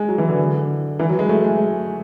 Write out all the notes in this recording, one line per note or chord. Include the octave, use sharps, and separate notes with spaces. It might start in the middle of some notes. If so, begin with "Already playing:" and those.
Already playing: G#3
F#3
E3
D3
E3
F#3
G#3
A3
G#3